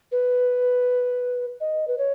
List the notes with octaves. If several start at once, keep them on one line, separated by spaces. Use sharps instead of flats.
B4
D#5
B4
C#5